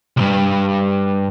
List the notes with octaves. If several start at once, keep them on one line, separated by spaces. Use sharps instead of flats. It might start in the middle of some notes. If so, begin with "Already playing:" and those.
C2 G2